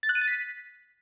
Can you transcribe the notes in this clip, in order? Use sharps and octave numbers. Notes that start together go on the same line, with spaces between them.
A6
F#6
D#7
A6
B6